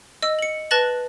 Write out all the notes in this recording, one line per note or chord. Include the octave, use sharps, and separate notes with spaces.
D#5 E6
C#7 F#7
B4 A5 F#6 A6 A#6 F#7